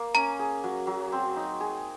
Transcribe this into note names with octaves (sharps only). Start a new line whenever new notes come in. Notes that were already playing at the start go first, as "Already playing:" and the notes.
Already playing: A#3
C#4 A#5
G#4
F#3
F#3
C4
D#4
G#4